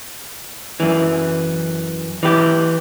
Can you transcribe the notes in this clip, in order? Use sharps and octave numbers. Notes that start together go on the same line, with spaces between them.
F#2 E3
E3 G4